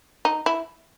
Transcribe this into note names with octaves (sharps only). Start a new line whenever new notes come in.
D#4
E4